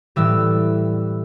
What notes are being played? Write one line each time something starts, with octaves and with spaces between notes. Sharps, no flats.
A2 E3 G3 E6